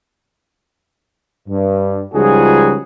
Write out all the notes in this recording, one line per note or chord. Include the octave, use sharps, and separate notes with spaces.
G2
C#2 F3 G3 D#4 F#4 G#4